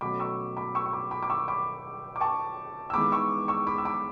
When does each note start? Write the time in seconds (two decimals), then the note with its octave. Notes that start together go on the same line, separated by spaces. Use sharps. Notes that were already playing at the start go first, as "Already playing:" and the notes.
0.01 B2 F#3 A3 C#4 B5 D6
0.20 C#6 E6
0.57 B5 D6
0.75 C#6 E6
0.86 C#6
0.92 B5 D6
1.11 B5 D6
1.23 D6
1.30 C#6 E6
1.48 B5 D6
2.16 D6
2.20 A5 C#6
2.90 E6
2.93 G#2 E3 G#3 B3 B5 D6
3.12 C#6 E6
3.48 C#6 E6
3.67 B5 D6
3.78 E6
3.85 B5 D6